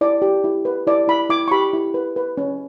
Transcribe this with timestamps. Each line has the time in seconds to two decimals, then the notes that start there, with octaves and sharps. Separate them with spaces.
0.01 E4 D5
0.22 G4
0.44 E4
0.65 B4
0.87 E4 D5
1.08 E4 B5
1.29 E4 D6
1.48 C#6
1.51 G4 B5
1.73 E4
1.94 B4
2.16 B4
2.37 C#4